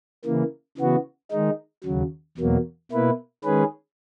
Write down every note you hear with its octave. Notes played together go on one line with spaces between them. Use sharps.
C#3 E3 A#3
C#3 E3 B3 F#4
D#3 G#3 D#4
D#2 C#3 F#3
E2 B2 F#3 A#3
B2 A#3 E4 B4
D#3 G#3 C#4 G#4 B4